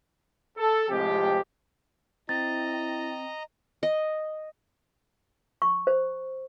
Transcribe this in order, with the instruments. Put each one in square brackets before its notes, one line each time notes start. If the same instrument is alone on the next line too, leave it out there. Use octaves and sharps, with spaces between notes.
[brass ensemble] A4
F2 A2 C3 F3 G#3 G4
[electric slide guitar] C4 [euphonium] E4 [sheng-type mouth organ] D#5 A#5 [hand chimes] A6
[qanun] D#5
[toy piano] C#6
C5